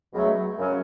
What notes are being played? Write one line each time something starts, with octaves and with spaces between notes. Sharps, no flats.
C#2 B2 F#3 A3
F#2 C#3 F#3 C#4